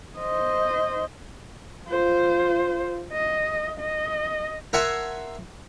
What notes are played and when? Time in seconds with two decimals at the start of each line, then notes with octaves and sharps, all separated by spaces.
0.18 C5 D#5
1.88 F4 C5
3.12 D#5
3.80 D#5
4.73 A#4 E5 F#5 G#5 A5 C6